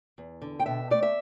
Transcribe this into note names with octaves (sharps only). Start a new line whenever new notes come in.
E2
D3
G5
B2 E5
A3 D5
E5